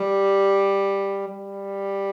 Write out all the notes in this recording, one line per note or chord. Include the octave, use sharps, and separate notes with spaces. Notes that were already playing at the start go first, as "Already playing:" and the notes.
Already playing: G3
G3